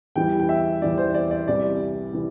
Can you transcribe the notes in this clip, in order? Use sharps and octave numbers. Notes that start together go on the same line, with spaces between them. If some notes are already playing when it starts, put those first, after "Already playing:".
E2 E3 G3 G5
G5
E5
E2 E3 G3 D5
C5
D5
D5
C2 C3 E3 G3 D5
C3 E3